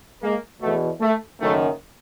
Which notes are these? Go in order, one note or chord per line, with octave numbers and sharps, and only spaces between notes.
G#3 A#3
E2 B2 A3
A3
F#1 F#2 D#3 A3